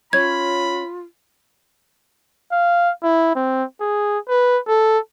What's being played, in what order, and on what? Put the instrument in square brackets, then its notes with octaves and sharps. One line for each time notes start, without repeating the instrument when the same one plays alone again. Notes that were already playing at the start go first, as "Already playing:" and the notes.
[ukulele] C#4 C#5 [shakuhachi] F4 [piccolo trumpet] B5 [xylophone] G#6
[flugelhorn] F5
E4
C4
G#4
B4
A4